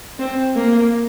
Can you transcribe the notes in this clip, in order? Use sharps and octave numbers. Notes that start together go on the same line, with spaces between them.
C4
A#3